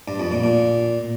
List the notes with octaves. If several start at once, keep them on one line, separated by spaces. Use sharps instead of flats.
G2
F2
A#2
A#2